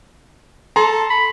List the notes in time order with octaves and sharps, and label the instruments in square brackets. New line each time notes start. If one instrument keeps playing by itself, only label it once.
[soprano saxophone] A4 [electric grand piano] A#5 C6
[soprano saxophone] B5